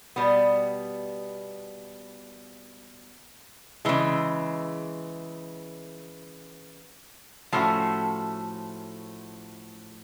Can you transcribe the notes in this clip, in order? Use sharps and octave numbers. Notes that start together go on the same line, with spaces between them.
B2 G3 B3
C#3 E3 G#3
A2 F3 A3 C#4 F#4